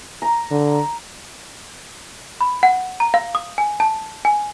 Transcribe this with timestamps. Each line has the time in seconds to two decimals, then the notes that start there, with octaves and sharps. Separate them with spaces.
0.22 A#5
0.51 D3
2.41 B5
2.63 F#5
3.00 A#5
3.14 F5
3.35 D#6
3.58 G#5
3.80 A5
4.25 G#5